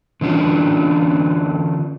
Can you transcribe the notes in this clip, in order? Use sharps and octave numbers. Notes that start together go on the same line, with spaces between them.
D3 E3 C#4 D4 F4 F#4